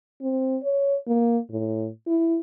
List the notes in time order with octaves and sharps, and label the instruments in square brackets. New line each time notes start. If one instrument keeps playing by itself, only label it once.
[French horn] C4
C#5
A#3
A2
E4